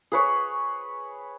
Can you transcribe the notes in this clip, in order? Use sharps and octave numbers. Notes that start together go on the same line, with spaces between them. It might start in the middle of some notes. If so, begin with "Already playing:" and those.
G#4 B4 C#5